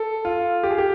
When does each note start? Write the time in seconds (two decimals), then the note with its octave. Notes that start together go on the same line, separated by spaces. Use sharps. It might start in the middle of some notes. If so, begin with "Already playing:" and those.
Already playing: A4
0.25 F4
0.63 G4
0.71 G#4
0.78 G4